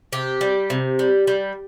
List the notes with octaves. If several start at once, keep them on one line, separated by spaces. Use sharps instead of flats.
C3 G4
G3
C3
G3
G3